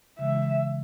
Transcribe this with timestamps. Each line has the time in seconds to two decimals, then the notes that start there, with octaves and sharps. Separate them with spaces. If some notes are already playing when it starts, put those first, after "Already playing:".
0.19 C#3 E3 G#3 E5